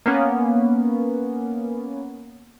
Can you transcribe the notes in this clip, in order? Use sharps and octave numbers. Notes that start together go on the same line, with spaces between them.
A#3 B3 C#4